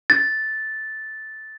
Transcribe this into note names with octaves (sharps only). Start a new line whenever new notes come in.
A6